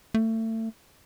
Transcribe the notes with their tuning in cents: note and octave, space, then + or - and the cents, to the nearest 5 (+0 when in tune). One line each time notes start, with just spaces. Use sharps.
A3 +30